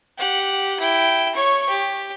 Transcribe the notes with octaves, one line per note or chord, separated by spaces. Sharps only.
G4 F#5
E4 G5
C#5 C#6
G4